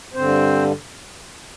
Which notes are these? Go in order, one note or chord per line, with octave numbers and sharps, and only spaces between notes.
G2 D3 C4 C5